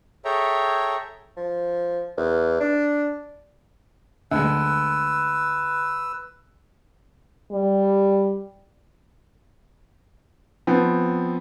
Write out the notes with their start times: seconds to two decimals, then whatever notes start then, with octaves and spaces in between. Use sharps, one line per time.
0.25 G#4 A4 C#5 E5 G5 A#5
1.37 F3
2.17 E2
2.60 D4
4.31 D2 G#3 B4 E6
7.52 G3
10.67 F3 B3 C4